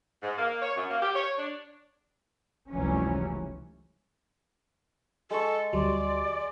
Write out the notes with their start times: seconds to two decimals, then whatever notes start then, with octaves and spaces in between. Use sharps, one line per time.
0.23 G#2
0.38 A#3
0.62 C#5
0.77 F#2
0.90 A#3
1.03 G4
1.16 C#5
1.38 D4
2.70 F1 C#2 E3 F#3 G3 C#4
5.31 G#3 A4 C#6
5.73 D2 F#3 G3 D5 C6